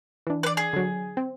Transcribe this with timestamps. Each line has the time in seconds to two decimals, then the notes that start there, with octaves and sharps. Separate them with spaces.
0.27 E3 D4
0.43 B4 D5
0.57 G#4
0.73 D3 F#3
1.17 C4